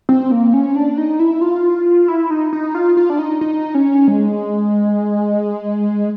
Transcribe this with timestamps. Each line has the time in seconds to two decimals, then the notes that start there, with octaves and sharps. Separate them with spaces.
0.09 C4
0.31 A#3
0.54 C#4
0.76 D4
0.98 D#4
1.19 E4
1.41 F4
2.08 E4
2.30 D#4
2.53 D#4
2.75 F4
2.97 F4
3.10 D4
3.19 D#4
3.41 D#4
3.75 C#4
4.08 G#3